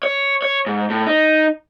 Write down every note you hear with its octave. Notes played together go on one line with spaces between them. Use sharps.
C#5
C#5
G#2
A2
D#4